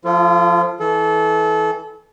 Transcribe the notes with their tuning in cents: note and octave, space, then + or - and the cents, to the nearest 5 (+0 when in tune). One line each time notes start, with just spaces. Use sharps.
F3 +10 F4 -35 A4 +0
E3 -20 A4 -30